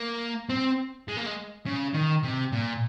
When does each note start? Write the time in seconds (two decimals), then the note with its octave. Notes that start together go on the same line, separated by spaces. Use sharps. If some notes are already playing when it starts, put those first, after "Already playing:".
Already playing: A#3
0.49 C4
1.08 G#3
1.17 A#3
1.26 G#3
1.66 C#3
1.94 D#3
2.24 C3
2.53 A#2